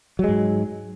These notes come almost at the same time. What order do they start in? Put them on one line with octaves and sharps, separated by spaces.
F#3 G#3 G#2